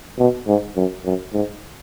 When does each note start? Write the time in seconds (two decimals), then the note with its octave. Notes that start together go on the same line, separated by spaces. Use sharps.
0.19 B2
0.47 G#2
0.76 F#2
1.05 F#2
1.33 G#2